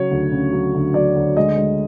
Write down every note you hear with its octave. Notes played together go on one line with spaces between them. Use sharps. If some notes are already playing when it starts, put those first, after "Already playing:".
Already playing: C#3 F#3 C#5
D2
C#3
F#3
D2
F#3 D5
D2
G#3 D#5
G#3